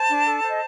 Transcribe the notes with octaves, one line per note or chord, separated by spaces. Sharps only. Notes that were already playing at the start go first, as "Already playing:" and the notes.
Already playing: C5 A5
D4
A4
C5
D#5